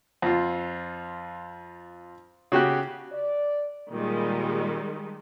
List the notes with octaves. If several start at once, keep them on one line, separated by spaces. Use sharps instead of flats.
F2 F4
C#3 F#4 G4 F#6
D5
A#2 D#3 G3 G#3